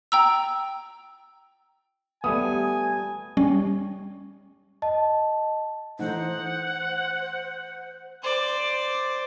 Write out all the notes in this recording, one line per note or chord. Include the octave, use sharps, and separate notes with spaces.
G5 A#5 E6
G3 A3 B3 G#5 D#6
G3 C#4
D#5 A5
E3 A3 D#4 C5 F#5
C5 D5